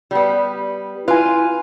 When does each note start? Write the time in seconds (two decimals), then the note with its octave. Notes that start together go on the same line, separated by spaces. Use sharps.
0.11 G3 B3
1.08 E4 F4 B4 G#5